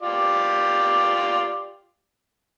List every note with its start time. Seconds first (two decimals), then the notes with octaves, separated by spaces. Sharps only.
0.02 F4 G4 D5